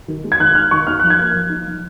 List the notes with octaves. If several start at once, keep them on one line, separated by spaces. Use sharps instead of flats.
D#3
G#3
G#6
D#3 F#6
D#4 F6
D#3 C#6
D#4 F6
F#6
F3
G#6
A#3
F3
D#4
F3